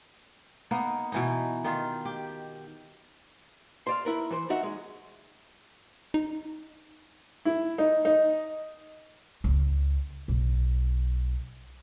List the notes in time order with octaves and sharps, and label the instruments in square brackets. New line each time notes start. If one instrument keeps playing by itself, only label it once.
[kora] A#3 B3 D#4
B2 E3 D#4
D#3 D#4 F4
G4
[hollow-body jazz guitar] C5 D5 F5
E4 A#4 B4
E3 C5
D#4 F#4 E5
G#3
[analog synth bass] D#4
[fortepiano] E4
D#4
D#4
[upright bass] C#2
B1